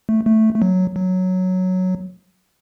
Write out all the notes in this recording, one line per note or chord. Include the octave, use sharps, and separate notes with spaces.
A3
A3
A3
F#3
F#3